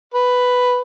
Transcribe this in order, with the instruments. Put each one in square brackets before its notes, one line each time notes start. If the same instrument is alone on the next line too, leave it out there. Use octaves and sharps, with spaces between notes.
[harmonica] B4